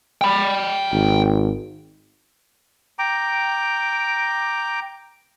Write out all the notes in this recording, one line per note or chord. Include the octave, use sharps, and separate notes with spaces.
G5 B5
G#1
G5 A#5 D6